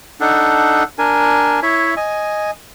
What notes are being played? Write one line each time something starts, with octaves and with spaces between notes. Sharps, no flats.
D4 D#4 A4 F#5
D4 A#4 G#5
E4 C#5 E5
D#5 G#5